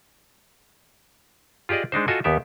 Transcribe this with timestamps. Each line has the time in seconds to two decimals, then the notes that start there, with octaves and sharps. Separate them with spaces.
1.69 F4 G4 G#4 D5 D#5
1.92 G#3 D4 D#4 C5
2.08 F4 F#4 A4 D#5 G#5
2.24 D#2 B3 G4 E5